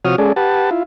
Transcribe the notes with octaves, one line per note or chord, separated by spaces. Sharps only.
C3 F3 F#4 C#5 D#6 F6
G#3 C#4 G#4 A4 D5
G4 B4 F#5 A5
E4 F4